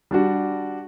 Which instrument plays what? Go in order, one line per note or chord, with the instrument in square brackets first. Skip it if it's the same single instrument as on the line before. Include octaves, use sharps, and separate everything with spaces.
[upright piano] G3 D4 F#4